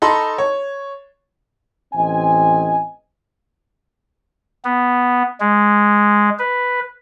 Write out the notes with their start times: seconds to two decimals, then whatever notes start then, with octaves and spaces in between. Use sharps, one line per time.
0.02 D#4 A4 A5 B5 C6
0.38 C#5
1.94 A1 C4 D#5 G#5
4.65 B3
5.40 G#3
6.39 B4